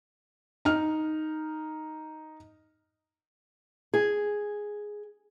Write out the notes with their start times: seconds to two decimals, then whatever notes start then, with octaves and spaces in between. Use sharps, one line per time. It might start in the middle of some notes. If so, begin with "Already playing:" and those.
0.65 D#4 F6
3.94 G#4